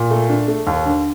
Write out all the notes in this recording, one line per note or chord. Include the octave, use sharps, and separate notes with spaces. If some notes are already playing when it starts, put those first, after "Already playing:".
Already playing: A#2
A3
D4
A3
D#2
D3